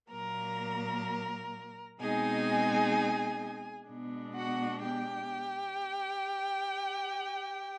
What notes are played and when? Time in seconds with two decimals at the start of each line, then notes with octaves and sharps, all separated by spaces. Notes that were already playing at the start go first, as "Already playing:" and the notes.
0.11 A#2 F#3 A#3 A#4 A#5
1.99 B2 G#3 C4 D#4 G#4 G#5
3.88 B2 G#3 B3 D4
4.35 F#4 F#5
4.82 G4 G5